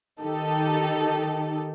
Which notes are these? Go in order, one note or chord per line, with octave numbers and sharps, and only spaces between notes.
D#3 D#4 G4 A4